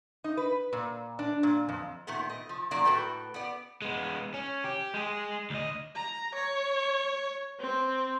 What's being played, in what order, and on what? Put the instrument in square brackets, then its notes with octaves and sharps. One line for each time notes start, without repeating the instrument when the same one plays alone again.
[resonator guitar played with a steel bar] D#4
B4
A#2
D4
A#2
F2
A#2 D#3 A3 B3
D#5
F3
D#3 F#3 A#3 D5
A2 F#4 A4 B4 G5
B3 D5
[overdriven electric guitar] G#3 B3
C#4
G4
G#3 G#4
D2 D#5
[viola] A#5
C#5
C4